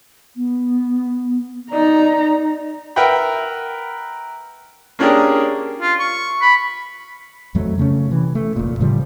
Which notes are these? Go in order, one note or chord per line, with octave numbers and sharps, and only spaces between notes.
B3
D#4 D5 A#5
A#4 B4 E5 F#5 G5 B5
A#3 C#4 D4 G4 G#4 A#4
F4
C#6
B5
F2 F#3 A3
C#3 A3 A#3 C#4
C3 E3
A3
F1 A#2
A2 C#3 F3 G3